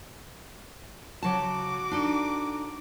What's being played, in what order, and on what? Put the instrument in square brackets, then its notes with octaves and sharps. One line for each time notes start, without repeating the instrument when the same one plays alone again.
[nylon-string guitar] C#3 F#3 A5 [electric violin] F#4 D6
[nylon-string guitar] D4 D#4 A4